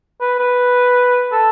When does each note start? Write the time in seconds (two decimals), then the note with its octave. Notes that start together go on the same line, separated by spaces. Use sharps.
0.21 B4
0.39 B4
1.32 A4